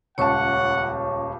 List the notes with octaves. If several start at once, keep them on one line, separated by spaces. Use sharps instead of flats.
D#1 C#2 C#5 F#5 A5 C#6